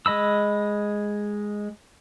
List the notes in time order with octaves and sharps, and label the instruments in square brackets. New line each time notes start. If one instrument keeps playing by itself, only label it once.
[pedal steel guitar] G#3 D#5 B5 E6